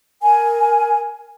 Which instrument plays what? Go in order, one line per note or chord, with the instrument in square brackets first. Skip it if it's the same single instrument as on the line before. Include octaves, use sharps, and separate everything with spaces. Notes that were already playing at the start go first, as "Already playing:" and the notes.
[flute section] A#4 G#5